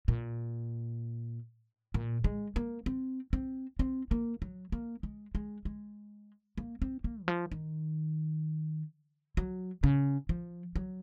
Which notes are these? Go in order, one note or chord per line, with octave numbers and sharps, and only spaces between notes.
A#2
A#2
G#3
A#3
C4
C4
C4
A#3
F#3
A#3
G#3
G#3
G#3
A#3
C4
A#3
D#3
F3
D#3
F#3
C#3
F3
F#3